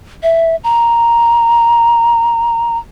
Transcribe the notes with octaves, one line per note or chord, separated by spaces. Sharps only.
E5
A#5